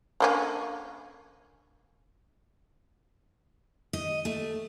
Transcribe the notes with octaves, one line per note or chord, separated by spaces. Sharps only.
D3 A#3 C#4
D#5
A3